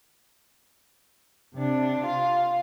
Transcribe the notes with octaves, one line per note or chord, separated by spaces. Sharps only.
C3 D4
F4